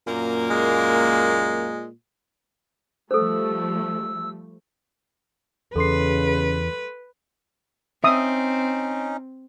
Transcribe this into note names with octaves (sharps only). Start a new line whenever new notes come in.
F#2 A#2 A#3
G#3
F3 G3 A3 A4 C5 E6
E2 C#3 A4 B4 C6 C7
C4 C#4 D#4 E5 D#6